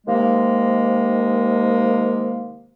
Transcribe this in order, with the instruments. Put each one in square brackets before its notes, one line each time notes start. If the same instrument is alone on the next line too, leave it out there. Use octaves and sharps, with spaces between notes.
[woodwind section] C3 D#3 G#3 A#3